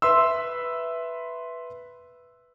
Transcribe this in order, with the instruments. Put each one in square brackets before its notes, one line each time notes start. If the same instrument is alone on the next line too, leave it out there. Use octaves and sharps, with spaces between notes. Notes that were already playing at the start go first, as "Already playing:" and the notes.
[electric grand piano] B4 E5 C6 E6